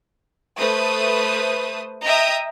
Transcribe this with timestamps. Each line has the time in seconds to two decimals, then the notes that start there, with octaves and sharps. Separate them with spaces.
0.58 A3 B4 C5 D#6
2.03 D#5 E5 G5 A#5 D#6